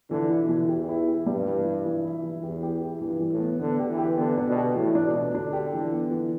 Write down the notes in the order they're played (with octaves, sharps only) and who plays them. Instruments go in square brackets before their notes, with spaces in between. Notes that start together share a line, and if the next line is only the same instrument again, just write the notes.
[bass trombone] D3 [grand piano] E3
[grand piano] E4
[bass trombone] B2
[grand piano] E3
[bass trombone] E2 [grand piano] G4
[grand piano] E4
G4
[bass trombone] G2 [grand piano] G3
[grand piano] E3
E4
E3
E4
E3
[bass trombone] E2 [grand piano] G4
[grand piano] G4
E4
[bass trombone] G2 [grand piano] E3
[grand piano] E3
[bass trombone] A2
[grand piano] B3
[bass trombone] D3 [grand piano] B3
[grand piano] G4
[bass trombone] E3
[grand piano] G4
[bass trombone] D3 [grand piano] B3
[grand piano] D4
[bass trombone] B2
[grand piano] G4
[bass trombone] A2 [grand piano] E3
[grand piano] D4
[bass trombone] B2
[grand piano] D4
[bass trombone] D3 [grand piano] D4
[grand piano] G4
E3
B3
E3